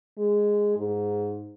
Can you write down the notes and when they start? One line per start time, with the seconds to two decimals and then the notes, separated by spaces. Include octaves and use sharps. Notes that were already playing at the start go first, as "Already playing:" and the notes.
0.18 G#3
0.77 G#2